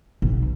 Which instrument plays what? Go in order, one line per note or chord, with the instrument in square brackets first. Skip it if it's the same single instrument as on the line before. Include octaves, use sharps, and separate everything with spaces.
[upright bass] B1